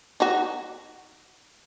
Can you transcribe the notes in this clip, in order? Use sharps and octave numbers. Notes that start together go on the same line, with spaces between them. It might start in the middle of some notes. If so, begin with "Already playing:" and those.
D#4 F#4